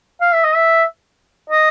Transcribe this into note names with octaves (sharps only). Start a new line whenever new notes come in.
F5
E5
D#5
E5
D#5